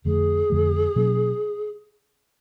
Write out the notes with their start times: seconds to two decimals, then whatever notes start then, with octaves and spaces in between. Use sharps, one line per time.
0.05 F2 D3 F3 A3 G#4
0.50 F2 D3 F3 A3
0.96 B2 F#3 A#3 C#4